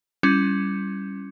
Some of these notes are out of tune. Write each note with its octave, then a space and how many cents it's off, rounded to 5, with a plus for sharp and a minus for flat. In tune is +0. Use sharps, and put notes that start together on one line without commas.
G3 +0 C#4 +0 E4 +25